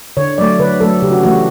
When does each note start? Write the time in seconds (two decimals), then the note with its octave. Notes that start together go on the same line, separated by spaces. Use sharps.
0.17 D3 C#5
0.38 F#3 A3 D5
0.59 D3 B4
0.80 F#3 A3 A4
1.02 C#3 G4
1.12 F#4
1.23 E3 F#4
1.26 A3
1.33 G4